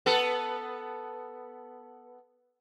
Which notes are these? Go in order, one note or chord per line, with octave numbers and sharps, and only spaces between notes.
B3 A4